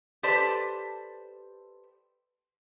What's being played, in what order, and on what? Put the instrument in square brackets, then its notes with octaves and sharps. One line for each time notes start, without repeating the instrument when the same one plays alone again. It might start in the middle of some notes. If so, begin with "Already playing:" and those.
[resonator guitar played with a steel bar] G4 A4 B4 C5 D5 A5